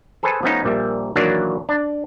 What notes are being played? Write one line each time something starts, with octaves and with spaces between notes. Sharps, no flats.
G#4 A4 B4 C5 G#5 A5
F3 A3 B3 C#4 D#4
A#1 A#2 G3 E5
A#2 D#3 E3 F#3 A#3 D4
D4